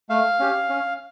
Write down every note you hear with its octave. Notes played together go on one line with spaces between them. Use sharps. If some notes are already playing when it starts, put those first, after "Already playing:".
A3 F5
C#4 G4
C#4